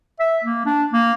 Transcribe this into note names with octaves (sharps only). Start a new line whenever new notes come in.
E5
A#3
D4
A#3